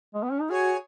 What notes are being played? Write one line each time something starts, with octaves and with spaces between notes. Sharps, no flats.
G#3
B3
C#4
D#4
F#4 G#4 C#5 G#5